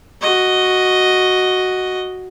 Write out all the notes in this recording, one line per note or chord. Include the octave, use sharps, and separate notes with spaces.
F#4 D#5